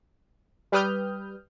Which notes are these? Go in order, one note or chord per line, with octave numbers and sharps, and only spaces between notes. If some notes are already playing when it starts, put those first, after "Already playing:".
G3 G4 B4 D#6 F6 G6